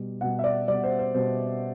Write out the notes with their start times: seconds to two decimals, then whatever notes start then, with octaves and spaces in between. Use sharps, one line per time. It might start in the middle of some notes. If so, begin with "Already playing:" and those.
Already playing: B2 G3
0.21 B2 G3 F#5
0.39 E5
0.44 D5
0.67 G3 D5
0.72 B2
0.84 C5
0.99 C5
1.14 B2 G3 C5